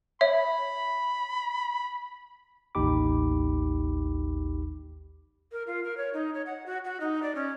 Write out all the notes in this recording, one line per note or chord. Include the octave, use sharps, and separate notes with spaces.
C#5 E5 B5
A1 D#2 D#4 G4 B5 D6
A#4
F4
A#4
C#5
D#4
C#5
F#5
F#4
F#4
D#4
D5
C#4